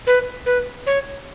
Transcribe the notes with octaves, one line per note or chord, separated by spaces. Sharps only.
B4
B4
C#5